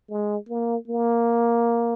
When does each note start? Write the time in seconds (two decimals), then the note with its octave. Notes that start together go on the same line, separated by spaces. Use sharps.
0.09 G#3
0.49 A#3
0.88 A#3